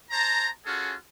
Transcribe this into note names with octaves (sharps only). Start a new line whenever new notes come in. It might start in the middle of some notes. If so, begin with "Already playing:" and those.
C5 A5 A#5
C#4 F4 F#4 G#4 A4